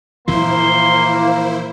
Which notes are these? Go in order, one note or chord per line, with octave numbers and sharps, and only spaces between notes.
A#2 E3 F3 A#3 E4 C5 C6